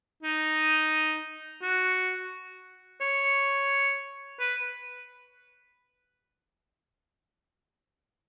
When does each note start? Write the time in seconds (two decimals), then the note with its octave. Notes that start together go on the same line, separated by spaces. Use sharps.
0.23 D#4
1.62 F#4
3.01 C#5
4.40 B4